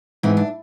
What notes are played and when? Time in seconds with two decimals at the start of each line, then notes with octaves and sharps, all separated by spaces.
0.23 G#2 E3 C4
0.37 D4